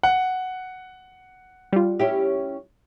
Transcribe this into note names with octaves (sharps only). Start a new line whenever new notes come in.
F#5
G3 F4
C#4 E4 G4